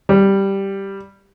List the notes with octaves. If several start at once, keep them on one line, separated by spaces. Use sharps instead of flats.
G3